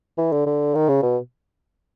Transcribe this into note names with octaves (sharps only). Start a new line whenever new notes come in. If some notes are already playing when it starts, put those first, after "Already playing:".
E3
D3
D3
D#3
C#3
B2